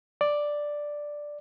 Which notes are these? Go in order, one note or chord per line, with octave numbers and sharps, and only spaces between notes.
D5